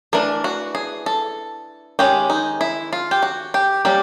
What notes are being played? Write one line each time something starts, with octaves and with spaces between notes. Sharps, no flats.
E3 A3 D4 A#4
F#4
G#4
A4
D#3 G#3 C#4 G4
D#4
E4
F4
G4
F#4
G4
G3 A#3 C#4 G4